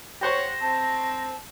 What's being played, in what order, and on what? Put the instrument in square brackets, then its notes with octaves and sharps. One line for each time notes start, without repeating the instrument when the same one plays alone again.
[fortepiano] G4 C5 C#6 [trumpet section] C#5 F#5 [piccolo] A#6
[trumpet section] C4 [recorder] A5